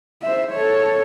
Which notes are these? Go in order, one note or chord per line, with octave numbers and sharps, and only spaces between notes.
C5 E5
A4 C#5